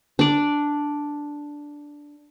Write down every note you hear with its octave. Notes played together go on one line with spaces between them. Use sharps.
D4 D5